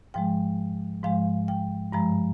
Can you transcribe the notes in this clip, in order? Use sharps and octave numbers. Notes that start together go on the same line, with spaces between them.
G#2 F3 G#3 G5
G#2 F3 G#3 F5
G5
G2 F3 G#3 A#5